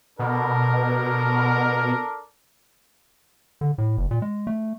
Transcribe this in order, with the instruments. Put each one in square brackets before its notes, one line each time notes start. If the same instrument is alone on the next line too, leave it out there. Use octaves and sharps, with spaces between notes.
[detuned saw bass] B2 [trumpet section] D4 A4 A#4
[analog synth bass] D3
A2
F#1
A#2
G#3
A3